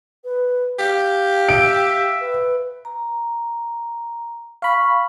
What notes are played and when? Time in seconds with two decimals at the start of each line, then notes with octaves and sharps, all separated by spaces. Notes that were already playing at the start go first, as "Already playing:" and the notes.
0.24 B4
0.79 G4 F5
1.49 E5 D7
2.20 B4
2.85 A#5
4.62 F5 B5 C#6